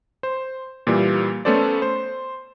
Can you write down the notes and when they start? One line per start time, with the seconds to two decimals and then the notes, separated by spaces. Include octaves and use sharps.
0.23 C5
0.87 A#2 E3 G3
1.45 A3 B3 C#4 A4 C5 D5
1.82 C5